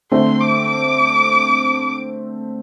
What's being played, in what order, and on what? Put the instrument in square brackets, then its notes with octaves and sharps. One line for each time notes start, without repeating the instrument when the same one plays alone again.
[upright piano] D3 A3 C4 [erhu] C6
[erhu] D6
D6